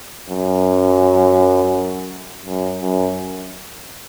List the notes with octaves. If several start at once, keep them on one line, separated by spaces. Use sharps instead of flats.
F#2
F#2
F#2